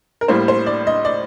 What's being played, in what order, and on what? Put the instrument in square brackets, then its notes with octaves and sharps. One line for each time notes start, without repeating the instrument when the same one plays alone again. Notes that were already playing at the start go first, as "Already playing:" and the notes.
[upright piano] A#4
A2 G3 A#3 C5
C5
D5
D#5
D5